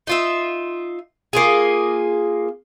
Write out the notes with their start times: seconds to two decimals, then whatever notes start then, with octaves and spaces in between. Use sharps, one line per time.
0.07 D#4 F4 E5
1.33 A#3 F4 G#4